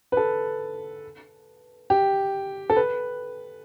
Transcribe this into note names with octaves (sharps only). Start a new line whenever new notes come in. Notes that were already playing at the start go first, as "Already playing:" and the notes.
B4
A4
G4
A4
B4